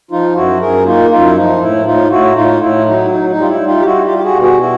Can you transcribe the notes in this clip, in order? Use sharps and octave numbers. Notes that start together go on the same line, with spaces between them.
F3 D#4 F4
F#2 E4 F#4
F#2 G#4 A#4
A#3 D#4 F4
F#2 D#4 F4
E4
F3 D#4
A2 E4
A2 D#4 F4
A2 E4 F#4
A2 D#4 F4
A2 E4
F#3 D#4
E4
D#4
D#4
G3
F4
E4
G3
D#4 F4
G4
G3 E4 F#4
F4 G4
G3
G4
F#4 G#4
B2
F#4 G#4
E4 F#4